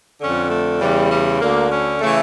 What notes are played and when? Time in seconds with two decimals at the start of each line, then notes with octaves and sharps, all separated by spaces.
0.20 F2 D3 C#4
0.51 A3
0.81 E2 C#3 E3 G3
1.11 G3
1.41 D2 D3 A#3
1.71 C#4
2.01 C#3 E3 A3